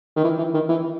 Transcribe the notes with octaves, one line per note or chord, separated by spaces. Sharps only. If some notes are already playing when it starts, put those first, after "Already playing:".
D#3
E3
E3
D#3
E3